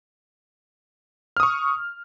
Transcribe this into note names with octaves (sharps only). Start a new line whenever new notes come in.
C#6 D#6 F6